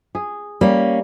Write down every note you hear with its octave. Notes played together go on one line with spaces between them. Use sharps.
G#4
G3 A#3 C#4